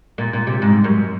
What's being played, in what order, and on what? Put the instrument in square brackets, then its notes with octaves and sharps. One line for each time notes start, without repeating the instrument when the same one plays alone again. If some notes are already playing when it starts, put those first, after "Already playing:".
[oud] A#2
A#2
C3
G#2
F#2